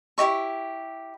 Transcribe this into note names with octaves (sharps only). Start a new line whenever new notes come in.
E4 G4 D#5 C#6